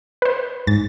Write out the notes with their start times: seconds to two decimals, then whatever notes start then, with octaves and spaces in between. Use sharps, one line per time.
0.22 B4 C5
0.67 G#2 A6